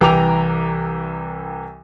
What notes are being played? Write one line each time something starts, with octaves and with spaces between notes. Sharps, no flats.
C2 E3 G5 A#5 D6 F7